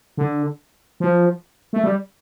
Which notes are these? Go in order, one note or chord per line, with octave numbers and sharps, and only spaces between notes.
D3
F3
A3
G3